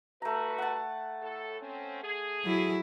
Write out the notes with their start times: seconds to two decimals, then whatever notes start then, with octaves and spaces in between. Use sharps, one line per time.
0.22 G2 A3 F#4 B4 A#5
0.58 F#5 A5
1.21 A2 A4
1.60 C4 C#4
2.03 G#4
2.45 F#3 E4